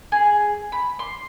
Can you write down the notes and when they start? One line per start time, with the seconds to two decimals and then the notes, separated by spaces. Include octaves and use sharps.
0.12 G#4
0.72 B5
0.99 C6